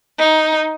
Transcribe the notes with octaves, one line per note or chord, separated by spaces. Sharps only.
D#4